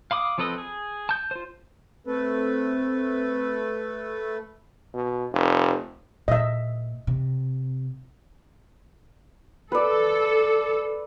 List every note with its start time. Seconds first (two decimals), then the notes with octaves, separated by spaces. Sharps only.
0.11 F5 B5 D6 D#6
0.38 F3 C4 A4 B4 D#5
0.58 G#4
1.09 A5 G6
1.31 F4 C5
2.07 A3 C4 A4 B4
4.94 B2
5.32 F1
6.28 A#2 D#5 E5
7.07 C3
9.72 A4 B4 D5